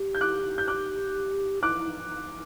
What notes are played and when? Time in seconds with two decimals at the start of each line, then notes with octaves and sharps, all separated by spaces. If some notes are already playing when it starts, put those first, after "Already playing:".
Already playing: G4
0.15 G6
0.21 D6 F#6
0.58 G6
0.68 D6 F#6
1.63 E4 D6 F#6